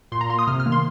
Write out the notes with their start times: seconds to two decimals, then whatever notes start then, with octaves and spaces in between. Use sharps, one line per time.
0.12 A#2 C6
0.21 A#5
0.30 A#3 C6
0.39 D#6
0.47 C3 F6
0.60 F6
0.66 D#3 A#3
0.72 C6